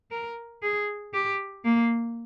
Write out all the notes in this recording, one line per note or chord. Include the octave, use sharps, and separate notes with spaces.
A#4
G#4
G4
A#3